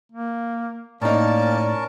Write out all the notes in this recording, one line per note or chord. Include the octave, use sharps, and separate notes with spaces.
A#3
A2 A#3 C#4 D#4 A#4 D5 A5